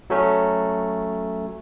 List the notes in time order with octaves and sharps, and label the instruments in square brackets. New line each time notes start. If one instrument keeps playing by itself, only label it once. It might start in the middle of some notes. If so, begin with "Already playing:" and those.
[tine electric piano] F#3 A3 C#4